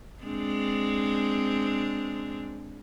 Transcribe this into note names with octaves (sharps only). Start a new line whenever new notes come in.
G#3 C4 D4